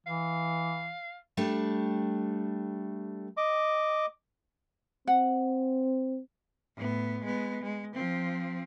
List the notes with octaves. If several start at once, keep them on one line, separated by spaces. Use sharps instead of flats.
E3 F5
G3 A3 D4
D#5 D6
C4 F#5
A2 B3
G#3 B3
G#3
F3 C4